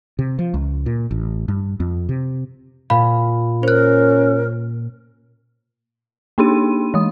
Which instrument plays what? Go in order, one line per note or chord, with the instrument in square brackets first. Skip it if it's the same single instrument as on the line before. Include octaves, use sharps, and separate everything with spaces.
[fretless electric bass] C3
F3
C#2
A#2
A1
G2
F2
C3
[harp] A#2 [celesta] F5 B5
[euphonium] C#4 [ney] A#4 [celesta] C5 F#6
[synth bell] A#3 D4 D#4 G4 D#7
E3 G#3 D#6